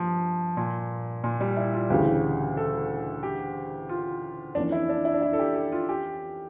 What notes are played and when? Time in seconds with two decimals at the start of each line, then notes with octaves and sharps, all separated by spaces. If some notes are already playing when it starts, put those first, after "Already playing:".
Already playing: G2 F3 A#3
0.57 A#2
1.24 A#2
1.41 G3
1.57 E4
1.74 F4
1.90 D2 C#3 E3 G4
2.57 A4
3.23 G4
3.89 F4
4.55 F2 E3 A#3 C#4 D4
4.72 E4
4.89 D4
5.05 E4
5.14 D4
5.22 E4
5.33 A4
5.39 G4
5.55 G4
5.72 F4
5.89 G4